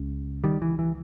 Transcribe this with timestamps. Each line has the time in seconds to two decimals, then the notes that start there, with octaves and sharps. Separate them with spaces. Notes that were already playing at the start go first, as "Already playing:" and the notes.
Already playing: C#2 C#3
0.44 D#3 G3
0.62 E3
0.79 E3